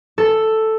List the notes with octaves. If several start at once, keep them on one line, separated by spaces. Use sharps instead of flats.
A4